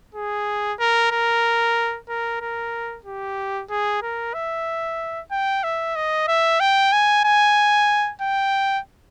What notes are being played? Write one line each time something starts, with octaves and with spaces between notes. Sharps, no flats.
G#4
A#4
A#4
A#4
A#4
G4
G#4
A#4
E5
G5
E5
D#5
E5
G5
G#5
G#5
G5